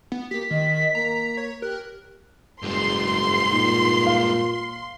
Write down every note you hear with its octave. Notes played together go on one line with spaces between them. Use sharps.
B3
A#3 G4 B6
D#3 D#5
A#3 A#5
C#5
G4 A#4 F#6
F#1 G2 G#3 C6
A#2 D#4
F5